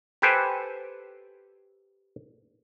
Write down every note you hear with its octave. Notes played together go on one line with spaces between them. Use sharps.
G4 A4 B4 C5 G5 G#5